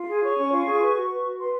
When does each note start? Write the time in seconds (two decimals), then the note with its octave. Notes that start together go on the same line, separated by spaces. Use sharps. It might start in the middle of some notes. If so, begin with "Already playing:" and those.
Already playing: F4
0.08 G#4
0.23 C#5 C#6
0.37 C#4
0.51 F4
0.66 G#4
0.81 B4
0.95 F#4
1.10 B4
1.24 F#4
1.38 B4 C6